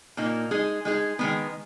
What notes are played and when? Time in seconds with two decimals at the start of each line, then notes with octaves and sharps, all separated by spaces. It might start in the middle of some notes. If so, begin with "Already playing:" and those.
0.17 A#2 A#3 D#4
0.51 G#3 D#4 G#4
0.85 G#3 D#4 G#4
1.19 D#3 G#3 B3